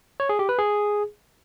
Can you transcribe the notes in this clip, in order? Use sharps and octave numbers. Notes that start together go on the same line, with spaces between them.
C#5
G#4
G4
B4
G#4